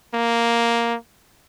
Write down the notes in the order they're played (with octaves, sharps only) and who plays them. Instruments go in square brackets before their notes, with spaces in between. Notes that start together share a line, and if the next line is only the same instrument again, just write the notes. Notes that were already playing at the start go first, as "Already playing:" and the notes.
[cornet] A#3